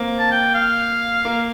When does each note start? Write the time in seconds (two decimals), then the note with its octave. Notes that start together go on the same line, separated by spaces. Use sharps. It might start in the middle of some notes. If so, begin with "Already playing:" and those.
Already playing: A#3 C4
0.19 A5
0.31 G5
0.55 F5
1.25 A#3